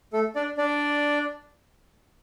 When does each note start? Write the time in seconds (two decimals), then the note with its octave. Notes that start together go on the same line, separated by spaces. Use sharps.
0.13 A3 A4
0.35 D4 D5
0.58 D4 D5